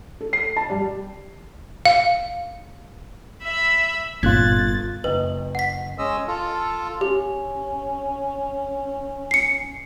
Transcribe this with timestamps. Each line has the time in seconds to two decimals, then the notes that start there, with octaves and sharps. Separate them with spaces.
0.21 A4
0.33 C7
0.56 A5
0.70 G3
1.86 F5
3.41 E5 B5 E6
4.23 G1 A#2 C#4 F4 F#6 G#6 A6
5.04 F#1 B4 D#5 G5
5.55 F#5 B6
5.98 G#3 C#4 D#5 E6
6.27 F4 A4
7.01 C#4 G4
9.31 C7 C#7